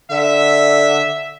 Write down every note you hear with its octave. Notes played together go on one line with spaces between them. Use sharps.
D3 E5